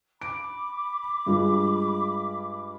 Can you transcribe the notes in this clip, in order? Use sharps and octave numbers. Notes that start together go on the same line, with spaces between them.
B5 D6 D7
G2 G#3 F4